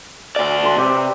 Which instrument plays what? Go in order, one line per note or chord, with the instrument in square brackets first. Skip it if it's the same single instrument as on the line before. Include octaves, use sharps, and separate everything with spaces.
[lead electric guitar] D2 D5
[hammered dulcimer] B4 C6
[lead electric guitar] C3 [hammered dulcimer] G4 D5 E5